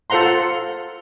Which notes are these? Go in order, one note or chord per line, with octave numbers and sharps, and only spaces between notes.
F4 A4 C5 F#5 A#5 C6